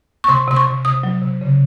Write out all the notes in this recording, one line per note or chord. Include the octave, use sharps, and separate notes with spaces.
C#6
C3 C6
C3 C6
C#6
C3
C3 D#6
F#3
C3
C#3